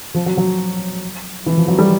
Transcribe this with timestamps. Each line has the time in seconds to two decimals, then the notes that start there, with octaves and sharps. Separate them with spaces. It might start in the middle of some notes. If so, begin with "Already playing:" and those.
0.14 F3
0.26 F#3
0.37 F#3
1.46 E3
1.57 F3
1.68 F#3
1.79 G3